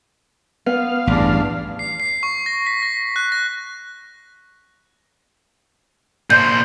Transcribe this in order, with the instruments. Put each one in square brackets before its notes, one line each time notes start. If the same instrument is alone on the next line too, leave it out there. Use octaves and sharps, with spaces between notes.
[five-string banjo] B3 [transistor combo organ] F5
[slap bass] A1 G2 [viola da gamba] E2 D4
[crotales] C7
C7
C#6
A#6
B6
A#6
F#6
A#6
[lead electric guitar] A#2 C5 [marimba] G6